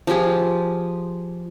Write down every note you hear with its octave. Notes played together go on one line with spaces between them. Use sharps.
F3 F4 G4 G#4